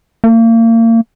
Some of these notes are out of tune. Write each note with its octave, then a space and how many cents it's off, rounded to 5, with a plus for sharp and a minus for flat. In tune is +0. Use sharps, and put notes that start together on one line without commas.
A#3 -35